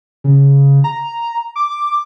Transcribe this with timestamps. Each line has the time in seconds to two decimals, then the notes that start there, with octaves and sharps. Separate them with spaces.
0.24 C#3
0.84 A#5
1.56 D6